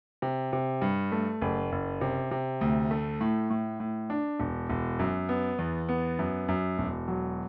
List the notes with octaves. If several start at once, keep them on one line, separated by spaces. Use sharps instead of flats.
C3
C3
G2
A3
F#1
F#1
C3
C3
D2
A3
A2
A2
A2
D4
E1
E1
F#2
B3
E2
B3
F#2
F#2
E1
F#3